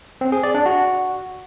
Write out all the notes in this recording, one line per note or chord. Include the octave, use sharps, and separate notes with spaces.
C4
G#4
D5
D4
F#4